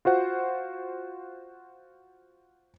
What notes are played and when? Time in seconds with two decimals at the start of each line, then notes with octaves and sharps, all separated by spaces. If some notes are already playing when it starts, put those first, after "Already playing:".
0.05 F4 F#4 C5 F#5